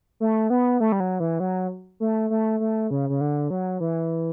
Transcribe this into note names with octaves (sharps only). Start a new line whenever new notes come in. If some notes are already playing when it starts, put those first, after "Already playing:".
A3
B3
A3
G3
F#3
E3
F#3
A3
A3
A3
C#3
C#3
D3
F#3
E3